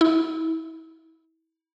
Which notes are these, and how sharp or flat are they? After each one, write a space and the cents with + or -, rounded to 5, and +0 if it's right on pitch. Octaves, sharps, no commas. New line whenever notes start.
E4 -30